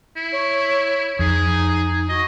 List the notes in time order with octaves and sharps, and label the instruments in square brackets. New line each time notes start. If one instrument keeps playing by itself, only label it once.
[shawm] E4
[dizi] C#5
[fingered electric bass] F2 [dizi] D#4 [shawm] G#4
[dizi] F#4 [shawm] D#5